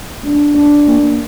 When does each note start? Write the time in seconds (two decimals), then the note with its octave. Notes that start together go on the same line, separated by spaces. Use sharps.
0.23 D4
0.54 D4
0.87 A#3